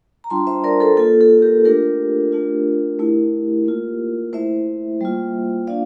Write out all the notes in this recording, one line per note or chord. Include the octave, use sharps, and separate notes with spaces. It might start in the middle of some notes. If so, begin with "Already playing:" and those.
A#5
G3 D4 F4 A5 C6
C5 E5
A#4 D5
A4 C5
A#3 F4 A4
A4
G4 A#4
A3 D4 F4 G4 A#4
A3 D4 F4
A3 E4
A#3 F4
A3 E4 C5 E5
G3 A#3 F4
A#3 D4 F4 D5 F5